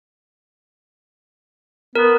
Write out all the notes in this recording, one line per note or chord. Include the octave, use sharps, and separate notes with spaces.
B3 A#4